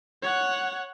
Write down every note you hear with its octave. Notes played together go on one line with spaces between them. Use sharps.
C#5 F#5